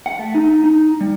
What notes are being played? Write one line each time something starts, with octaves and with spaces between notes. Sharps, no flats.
F#5
A3
D#4
D#4
G3